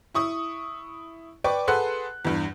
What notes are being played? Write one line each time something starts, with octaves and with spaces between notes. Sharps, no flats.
E4 C#6 D#6
B4 D5 G5 C#6 D6
G#4 A4 B4 F#5 C6 F#6
E2 G2